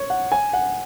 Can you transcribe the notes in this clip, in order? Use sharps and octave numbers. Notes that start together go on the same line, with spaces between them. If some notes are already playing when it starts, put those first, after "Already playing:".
Already playing: C#5
F#5
G#5
F#5